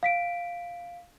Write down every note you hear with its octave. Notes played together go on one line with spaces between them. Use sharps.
F5 B6 D7